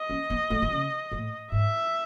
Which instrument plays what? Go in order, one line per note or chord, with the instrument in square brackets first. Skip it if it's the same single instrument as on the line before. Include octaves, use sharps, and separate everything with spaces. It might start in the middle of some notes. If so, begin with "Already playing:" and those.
Already playing: [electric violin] D#5
[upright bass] C#4
B3
A3
D#3
C#3
A2
[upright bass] G#2 [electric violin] E5